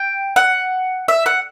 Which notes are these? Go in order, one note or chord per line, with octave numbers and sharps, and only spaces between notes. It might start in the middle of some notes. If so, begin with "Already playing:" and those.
Already playing: G5
F#5
E5
F#5